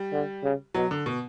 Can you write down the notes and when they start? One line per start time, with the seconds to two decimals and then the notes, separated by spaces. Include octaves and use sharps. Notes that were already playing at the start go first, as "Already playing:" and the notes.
Already playing: G3
0.13 D3
0.44 C#3
0.74 B2 F#3
0.91 D3
1.06 B2